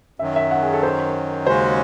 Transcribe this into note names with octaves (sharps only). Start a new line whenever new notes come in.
F#2 D#3 F#3 E5
E5
F#5
G#4
A4
C5
D#2 C#3 G#3 C#4 F#4 C5